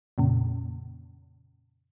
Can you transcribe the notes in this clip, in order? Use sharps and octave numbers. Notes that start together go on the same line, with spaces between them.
F2 A#2 C#3